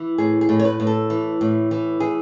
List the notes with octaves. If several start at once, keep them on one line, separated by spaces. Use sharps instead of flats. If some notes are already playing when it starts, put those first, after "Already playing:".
Already playing: E3
A2 G#4
G#4
A2
C#5
B4
A2
A4
E3
A2
E3
E3 G#4